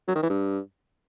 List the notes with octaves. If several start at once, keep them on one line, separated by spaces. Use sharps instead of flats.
F#3
D#3
E3
G2